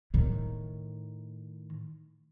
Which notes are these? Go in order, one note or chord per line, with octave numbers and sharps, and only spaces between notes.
A2 D#3